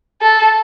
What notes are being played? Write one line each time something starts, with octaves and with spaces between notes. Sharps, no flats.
A4